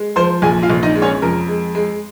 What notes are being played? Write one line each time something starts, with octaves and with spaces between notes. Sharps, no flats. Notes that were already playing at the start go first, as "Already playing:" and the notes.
Already playing: G#3
F3 C5 C6
A#1 G#4 G#5
F4 F5
A#1
D#4 D#5
G#3
C#4 C#5
F2 A#4
G#3
G#3